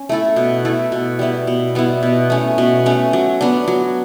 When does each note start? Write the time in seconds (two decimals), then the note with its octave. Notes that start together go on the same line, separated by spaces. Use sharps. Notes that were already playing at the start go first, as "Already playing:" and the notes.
Already playing: C#4
0.09 A3 E4 A4
0.36 B2
0.65 A3 E4 A4
0.92 B2
1.19 G3 B3 E4
1.47 B2
1.75 G3 B3 E4
2.03 B2
2.30 A3 C#4
2.58 B2
2.86 A3 C#4
3.13 F#3
3.41 B3 D4
3.68 F#3